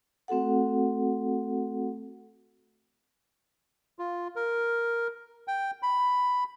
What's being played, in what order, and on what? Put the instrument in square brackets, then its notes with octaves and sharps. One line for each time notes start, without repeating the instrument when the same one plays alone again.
[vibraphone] A3 C4 F#4 A4 F#5
[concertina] F4
A#4
G5
B5